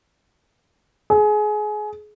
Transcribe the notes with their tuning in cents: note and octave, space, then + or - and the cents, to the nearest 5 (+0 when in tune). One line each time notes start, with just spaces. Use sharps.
G#4 +25